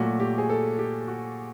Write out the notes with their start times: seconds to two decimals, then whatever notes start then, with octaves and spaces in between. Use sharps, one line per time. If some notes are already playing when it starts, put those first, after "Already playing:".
Already playing: A#2 F#3 A3 F#4
0.20 G4
0.38 G#4
0.49 A4
0.79 G4
1.08 F#4